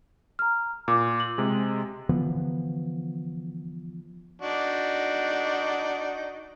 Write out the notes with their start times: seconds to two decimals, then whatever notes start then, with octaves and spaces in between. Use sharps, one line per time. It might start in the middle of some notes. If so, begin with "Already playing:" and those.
0.39 A#5 F6
0.88 A#2 D6
1.20 F#7
1.38 C3 G#3
2.09 D3 E3 F3 B3
4.42 D4 D#4 F#4